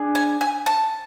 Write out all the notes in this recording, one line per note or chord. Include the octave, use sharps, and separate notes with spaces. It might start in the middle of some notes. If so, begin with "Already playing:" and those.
Already playing: D4 G#4
G#5
G#5
A5